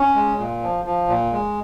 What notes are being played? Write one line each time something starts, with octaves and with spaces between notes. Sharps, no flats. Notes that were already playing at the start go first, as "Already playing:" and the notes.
Already playing: C#4
G#3
A#2
F3
F3
A#2
G#3